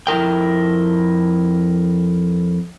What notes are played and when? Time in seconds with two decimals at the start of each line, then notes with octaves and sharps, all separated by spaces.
0.07 F2 E4 A#4 G5